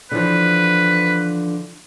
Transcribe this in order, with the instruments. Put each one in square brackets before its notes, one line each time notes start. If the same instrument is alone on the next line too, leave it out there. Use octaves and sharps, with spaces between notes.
[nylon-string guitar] D3 E3 F3 [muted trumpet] B4